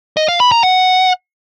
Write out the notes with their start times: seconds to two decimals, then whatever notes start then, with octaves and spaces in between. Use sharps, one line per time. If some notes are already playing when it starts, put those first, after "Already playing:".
0.17 D#5
0.28 F5
0.40 B5
0.52 A#5
0.63 F#5